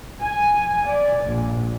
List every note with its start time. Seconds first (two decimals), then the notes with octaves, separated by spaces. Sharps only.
0.22 G#5
0.87 D5
1.24 A#1